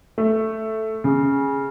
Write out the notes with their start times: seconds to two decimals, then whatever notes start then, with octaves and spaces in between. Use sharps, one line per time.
0.18 A3
1.04 C#3